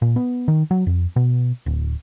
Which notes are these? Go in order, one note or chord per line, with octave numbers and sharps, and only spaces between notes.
A#2
B3
D#3
F#3
F2
B2
D1